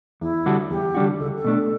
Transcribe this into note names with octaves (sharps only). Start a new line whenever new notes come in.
E2 E4
D3 G3 D4 F#4
E2 G4
D3 G3 D4 F#4
C#2 A4
A4
B2 A3 D4